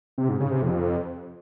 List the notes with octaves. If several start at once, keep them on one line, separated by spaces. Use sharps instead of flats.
C3
G#2
C#3
C3
F2